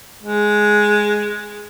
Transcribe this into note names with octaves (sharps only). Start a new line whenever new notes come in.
G#3